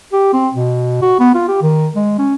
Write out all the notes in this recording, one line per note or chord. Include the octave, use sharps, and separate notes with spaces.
G4
C4
B2
F#4
B3
F4
G4
D#3
G#3
C#4